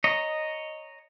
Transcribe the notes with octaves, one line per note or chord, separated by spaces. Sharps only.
C#5 D#5 A#5